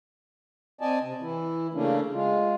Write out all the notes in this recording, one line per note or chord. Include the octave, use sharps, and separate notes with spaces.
C4 D5 D#5 G#5 A5
C3
E3 E4
C#3 A3 A#3 C#4 D4
G#3 F4